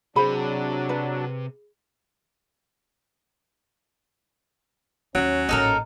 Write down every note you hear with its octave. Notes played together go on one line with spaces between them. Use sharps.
C3 F#3 D4 G#4 C5 B5
B4
D#2 F#3 C#4
A1 A#2 D#4 A4 A#4